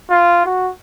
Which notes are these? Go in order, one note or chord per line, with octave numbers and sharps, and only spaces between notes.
F4
F#4